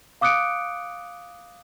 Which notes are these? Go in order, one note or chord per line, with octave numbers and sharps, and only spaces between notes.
F5 D6 D#6 F#6 C#7 D7